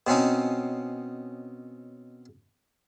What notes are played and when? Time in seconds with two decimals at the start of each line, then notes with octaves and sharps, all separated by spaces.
0.07 B2 C4 C#4 D#4